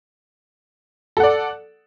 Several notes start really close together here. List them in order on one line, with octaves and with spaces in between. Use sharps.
A4 F#5 D5